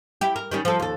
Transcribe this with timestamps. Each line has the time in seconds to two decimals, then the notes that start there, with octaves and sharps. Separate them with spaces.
0.21 E4 G4
0.36 A#4
0.51 D#3 G3 C#4
0.65 F3 A4
0.80 D#2 A4